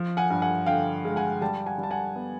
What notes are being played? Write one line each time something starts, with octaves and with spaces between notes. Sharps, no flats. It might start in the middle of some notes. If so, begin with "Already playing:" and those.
Already playing: F3
F#5 G#5
G2
F#5 G#5
D3 F5 G5
G#3
F#5 G#5
G3 G5 A5
F#5 G#5
G3
A5
F#5 G#5
B3